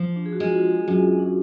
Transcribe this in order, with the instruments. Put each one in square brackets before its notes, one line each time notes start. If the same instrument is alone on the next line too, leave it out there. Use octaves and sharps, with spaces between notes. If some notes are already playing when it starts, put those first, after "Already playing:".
Already playing: [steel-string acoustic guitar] F3
[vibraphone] D4
G#4
F#4
[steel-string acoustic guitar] G#3 [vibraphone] F4
[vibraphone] F4
F#4
[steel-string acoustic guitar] F#2 [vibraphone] F4
[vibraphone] D4